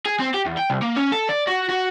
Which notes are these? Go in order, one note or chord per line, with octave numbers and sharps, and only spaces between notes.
G#4
C4
G4
E2
G5
C2
A#3
C#4
A4
D5
F#4
F#4